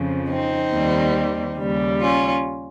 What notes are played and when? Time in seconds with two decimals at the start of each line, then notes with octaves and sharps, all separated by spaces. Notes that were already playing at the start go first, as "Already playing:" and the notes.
Already playing: F2 C#3 F3
0.30 C4 D#4
0.72 D#2 D#3 G3
1.58 D#2 C#3 G3
2.01 C#4 F4